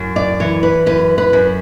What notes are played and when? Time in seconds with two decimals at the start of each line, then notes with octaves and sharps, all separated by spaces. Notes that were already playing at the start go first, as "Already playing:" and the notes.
Already playing: F#2
0.16 D5
0.40 E3 C#5
0.63 B4
0.86 F#2 B4
1.18 B4
1.33 F#2